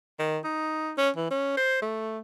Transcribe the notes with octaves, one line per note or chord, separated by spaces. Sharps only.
D#3
D#4
C#4
E3
C#4
C5
A3